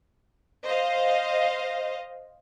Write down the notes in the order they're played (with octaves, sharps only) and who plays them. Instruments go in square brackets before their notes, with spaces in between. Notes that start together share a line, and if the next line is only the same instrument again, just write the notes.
[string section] C5 D#5 F5